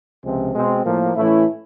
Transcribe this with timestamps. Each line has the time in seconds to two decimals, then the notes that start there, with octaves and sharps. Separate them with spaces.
0.24 C#2 C3 F3 G#3 C4
0.54 B2 G#3 C4
0.85 A2 F3 A#3
1.15 A2 E3 A3 C#4 E4